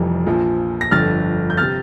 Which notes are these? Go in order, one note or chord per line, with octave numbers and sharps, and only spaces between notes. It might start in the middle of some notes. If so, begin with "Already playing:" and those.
Already playing: F1 F2 E3 G3
A#1 A#2 F3
A#6
G1 F2 D3 F6 A6
G6
C3 F6 A6